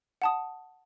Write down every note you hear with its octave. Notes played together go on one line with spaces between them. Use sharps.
F#5 A5 D#6